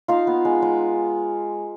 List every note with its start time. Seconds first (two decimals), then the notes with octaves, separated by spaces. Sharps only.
0.08 D#4 F4 F5
0.27 B3
0.45 G#3
0.62 G#3